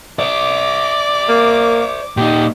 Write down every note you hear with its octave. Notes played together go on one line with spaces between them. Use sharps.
C5 D5 D6
A#3
A#2 D#4 G4